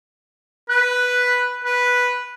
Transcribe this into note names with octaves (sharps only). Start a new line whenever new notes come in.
B4 F#6
B4